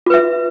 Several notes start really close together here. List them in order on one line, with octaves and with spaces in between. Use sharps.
F4 B4 E5